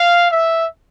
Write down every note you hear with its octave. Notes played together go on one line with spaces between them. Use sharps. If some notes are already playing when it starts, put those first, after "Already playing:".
Already playing: F5
E5